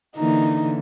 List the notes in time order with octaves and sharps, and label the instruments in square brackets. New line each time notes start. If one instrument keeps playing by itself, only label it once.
[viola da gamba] D3 E3 A#3 [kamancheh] D#4